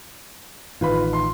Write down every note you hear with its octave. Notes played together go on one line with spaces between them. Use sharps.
A1 D#3 F4 B4 B5
C6